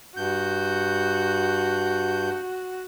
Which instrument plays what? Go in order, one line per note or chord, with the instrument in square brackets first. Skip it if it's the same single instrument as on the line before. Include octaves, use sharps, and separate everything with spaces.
[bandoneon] G2 G6 [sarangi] F#4